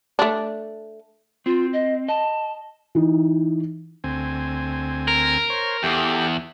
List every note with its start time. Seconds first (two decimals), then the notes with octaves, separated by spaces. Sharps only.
0.19 A3 D4
1.46 C4 F4
1.73 D#5
2.08 D#5 A5
2.95 E3 D#4
4.04 D2 C4 G#5
5.08 A#4
5.50 C5 C#5
5.83 E2 G4 A4 G5